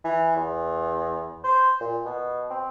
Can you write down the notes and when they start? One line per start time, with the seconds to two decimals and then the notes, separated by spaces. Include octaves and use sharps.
0.04 E3
0.36 E2
1.44 C5
1.80 A#2
2.05 B2
2.50 C4